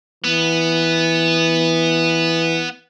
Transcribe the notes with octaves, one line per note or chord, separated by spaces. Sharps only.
E3 B3